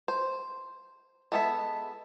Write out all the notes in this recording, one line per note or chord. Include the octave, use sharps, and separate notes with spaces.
C5
G#3 B3 A4 B4 E5